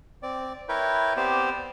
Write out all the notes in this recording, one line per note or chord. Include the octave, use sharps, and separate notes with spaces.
C4 D5
E4 A#4 B4 C#5 G5
B3 C4 G4 C5 D5